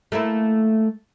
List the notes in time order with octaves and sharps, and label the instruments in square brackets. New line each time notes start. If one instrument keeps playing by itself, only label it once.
[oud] A3 A#3 E4